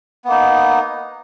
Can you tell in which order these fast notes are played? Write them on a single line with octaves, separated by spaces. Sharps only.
B3 A#3 D#4